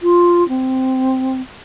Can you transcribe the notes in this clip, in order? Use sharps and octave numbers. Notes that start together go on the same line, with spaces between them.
F4
C4